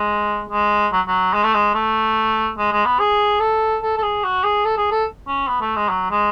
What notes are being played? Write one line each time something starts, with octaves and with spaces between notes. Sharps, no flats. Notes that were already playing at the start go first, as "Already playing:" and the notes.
Already playing: G#3
G#3
F#3
F#3
G#3
A3
G#3
A3
G#3
G#3
B3
G#4
A4
A4
A4
G#4
F#4
G#4
A4
G#4
A4
C#4
B3
A3
G#3
F#3
G#3